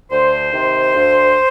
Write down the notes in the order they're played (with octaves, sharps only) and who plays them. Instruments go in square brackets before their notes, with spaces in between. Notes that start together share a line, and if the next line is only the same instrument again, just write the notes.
[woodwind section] D2 C5
C3 D#3
D2